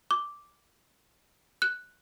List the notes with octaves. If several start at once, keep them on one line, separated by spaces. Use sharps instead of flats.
D6
F#6